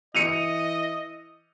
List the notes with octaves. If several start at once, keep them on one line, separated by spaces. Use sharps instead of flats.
E3 D#5 C#7 D#7 F7